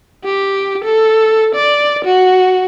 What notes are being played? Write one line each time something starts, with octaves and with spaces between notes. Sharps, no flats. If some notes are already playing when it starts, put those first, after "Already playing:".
G4
A4
D5
F#4